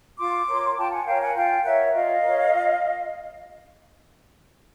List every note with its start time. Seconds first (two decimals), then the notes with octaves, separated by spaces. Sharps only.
0.19 F4 C6 D6
0.49 A#4 C#5
0.77 F4 G5 A5
0.92 F#5 G#5
1.06 A#4 C#5 F5 G5
1.21 F#5 G#5
1.35 F4 F5 G5
1.64 A#4 C#5 E5 F#5
1.93 F4 D#5 F5
2.23 A#4 C#5
2.52 F4